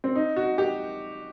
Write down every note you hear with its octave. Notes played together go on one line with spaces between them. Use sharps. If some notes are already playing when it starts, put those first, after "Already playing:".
C4
D#4
F#4
G4